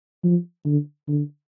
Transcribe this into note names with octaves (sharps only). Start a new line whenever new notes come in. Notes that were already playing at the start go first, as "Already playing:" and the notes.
F3
D3
D3